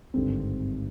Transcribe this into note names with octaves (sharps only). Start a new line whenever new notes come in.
G#1 G2 D3 G3 C4